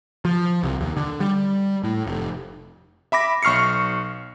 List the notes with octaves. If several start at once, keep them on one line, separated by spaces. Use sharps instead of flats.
F3
C2
D#2
D3
G3
A2
F1
E5 B5 D6 A#6
B1 C#6 F6 C7 C#7